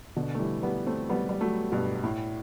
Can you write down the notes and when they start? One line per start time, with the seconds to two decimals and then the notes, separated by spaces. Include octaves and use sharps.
0.16 B2 D3
0.35 A3
0.39 E3 G3
0.63 G3 B3
0.86 A3 C4
1.10 G3 B3
1.29 G3
1.41 F#3 A3
1.72 G2 B2
2.04 A2